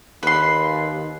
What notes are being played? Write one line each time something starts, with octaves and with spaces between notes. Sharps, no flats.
D#2 B4 C6